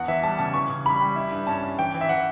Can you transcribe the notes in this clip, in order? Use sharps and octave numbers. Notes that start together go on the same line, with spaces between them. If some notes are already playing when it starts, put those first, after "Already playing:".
Already playing: E2 F#5
E3 E5
G3 A5
C#3 A5
E3 C#6
C#3
G3 B5
G3
E4
G2
C#4 A5
C#4
E3 G5
E3
E5
E3 F#5